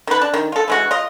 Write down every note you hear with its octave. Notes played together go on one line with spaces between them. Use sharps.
D#3 B4
D4
D#3
F4 A4
E3 G#3 F#4
F4 D#5